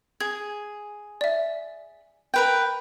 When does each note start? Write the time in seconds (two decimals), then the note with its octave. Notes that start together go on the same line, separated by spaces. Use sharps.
0.20 G#4 G#6
1.21 D5 E5
2.34 A#4 B4 G5